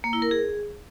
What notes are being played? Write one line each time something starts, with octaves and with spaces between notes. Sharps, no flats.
A#3
E4
A#4
G#4